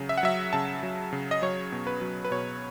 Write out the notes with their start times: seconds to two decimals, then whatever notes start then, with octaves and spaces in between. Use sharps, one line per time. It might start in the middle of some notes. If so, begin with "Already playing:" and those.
Already playing: C#3 F#3
0.09 E5
0.18 F#5
0.23 F#3 E5
0.53 C#3 A5
0.83 F#3
1.13 C#3
1.31 D#5
1.42 F#3 C#5
1.72 B2
1.87 B4
2.01 F#3
2.25 B4
2.31 B2 C#5